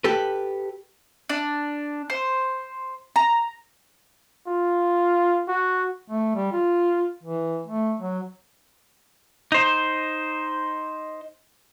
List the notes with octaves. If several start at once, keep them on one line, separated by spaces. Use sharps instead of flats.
G4 A4 B4
D4
C5
A#5
F4
F#4
A3
G3
F4
E3
A3
F#3
D#4 C5